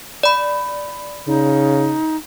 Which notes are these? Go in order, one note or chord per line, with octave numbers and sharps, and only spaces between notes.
D5 B5
C#3 D#4